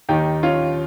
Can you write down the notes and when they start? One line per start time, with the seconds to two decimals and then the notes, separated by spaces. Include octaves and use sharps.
0.09 D#2 D#3 D#4 G4
0.43 C#4 F4